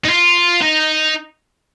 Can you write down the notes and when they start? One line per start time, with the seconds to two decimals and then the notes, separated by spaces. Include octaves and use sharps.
0.05 D#4
0.10 F4
0.61 D#4